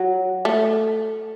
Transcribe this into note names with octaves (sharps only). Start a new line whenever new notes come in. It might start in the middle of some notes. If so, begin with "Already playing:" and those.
Already playing: F#3
A3